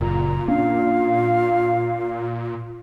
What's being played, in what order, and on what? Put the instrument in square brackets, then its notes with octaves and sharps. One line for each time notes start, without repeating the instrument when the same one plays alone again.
[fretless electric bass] F#1 [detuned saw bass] A#2 [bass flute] F4 [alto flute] A#5
[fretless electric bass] A#3 C#4 D4 [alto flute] F5